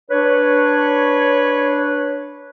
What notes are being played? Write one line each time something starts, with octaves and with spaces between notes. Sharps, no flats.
D4 B4 C#5